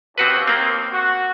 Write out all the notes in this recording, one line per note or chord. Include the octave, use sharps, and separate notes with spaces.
D#2 C4 F#4 B4
A#3 C4
F#4